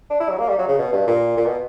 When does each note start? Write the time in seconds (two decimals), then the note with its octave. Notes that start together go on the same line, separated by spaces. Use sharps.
0.10 D4
0.20 E4
0.29 F#3
0.39 A#3
0.49 G3
0.59 F#3
0.68 C#3
0.78 B2
0.92 G2
1.07 A#2
1.37 A#2
1.46 B2